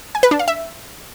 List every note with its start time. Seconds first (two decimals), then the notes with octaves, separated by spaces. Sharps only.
0.15 G#5
0.23 B4
0.31 D4
0.39 F5
0.48 E5